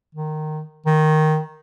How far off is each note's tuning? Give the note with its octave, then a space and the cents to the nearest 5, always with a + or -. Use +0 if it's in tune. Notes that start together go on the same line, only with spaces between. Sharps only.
D#3 -15
D#3 -5